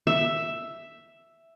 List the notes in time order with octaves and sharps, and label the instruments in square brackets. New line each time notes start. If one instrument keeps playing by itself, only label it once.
[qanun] E5